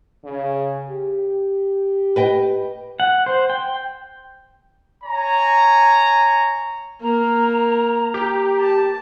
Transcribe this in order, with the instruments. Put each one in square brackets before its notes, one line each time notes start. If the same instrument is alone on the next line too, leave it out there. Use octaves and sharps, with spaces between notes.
[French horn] C#3
G4
[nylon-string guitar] B4 D#5 G5
[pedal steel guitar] F#5
C5
G5
[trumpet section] C#5 G#5 A#5
[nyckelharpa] A#3 A#4 [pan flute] A#5
[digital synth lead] G4
[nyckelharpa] A5